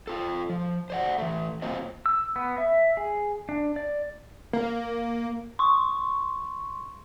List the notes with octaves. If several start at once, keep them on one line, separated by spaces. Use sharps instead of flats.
F4 A4
F3
C5 D5 F#5
E3 A3
F#3 A#3 C4 F4 C5 D#5
E6
B3
E5
G#4
D4
D5
A#3
C6 C#6